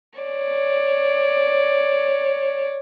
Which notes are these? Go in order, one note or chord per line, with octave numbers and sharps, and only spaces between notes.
C#5 D5